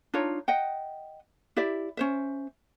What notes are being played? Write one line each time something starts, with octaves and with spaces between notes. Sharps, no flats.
D4 D#4 F4 C#5
D#5 F#5 G5
E4 G4 D5 E5
C#4 C5 E5